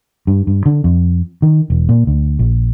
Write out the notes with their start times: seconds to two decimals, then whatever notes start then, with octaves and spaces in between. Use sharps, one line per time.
0.27 G2
0.47 G2
0.66 D3
0.84 F2
1.42 D#3
1.70 E1
1.89 A#2
2.07 D2
2.39 A#1